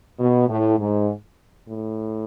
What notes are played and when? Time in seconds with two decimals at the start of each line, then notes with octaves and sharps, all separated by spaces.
0.19 B2
0.49 A2
0.79 G#2
1.69 A2